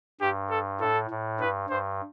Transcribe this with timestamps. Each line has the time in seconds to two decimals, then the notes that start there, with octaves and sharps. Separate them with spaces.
0.21 G2 G4
0.50 A4
0.80 A2 A4
1.10 A2
1.40 G2 B4
1.69 G2 C5